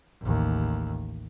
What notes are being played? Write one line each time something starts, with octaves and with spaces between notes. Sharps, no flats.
A1 D#2